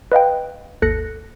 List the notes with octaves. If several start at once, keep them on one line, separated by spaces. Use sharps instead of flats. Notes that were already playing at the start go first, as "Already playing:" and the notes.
B4 D#5 F5 G5
G#1 D#2 A4 F#6 A#6 C#7